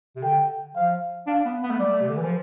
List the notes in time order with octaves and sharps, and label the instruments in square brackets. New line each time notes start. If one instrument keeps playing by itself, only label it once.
[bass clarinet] C3
[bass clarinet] D3 [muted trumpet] G5
[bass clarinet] F3 [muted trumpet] F5
[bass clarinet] D4 [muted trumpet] F5
[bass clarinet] B3
B3
A3
[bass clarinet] G3 [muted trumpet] D5
[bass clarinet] A3
C3
D3
E3
F3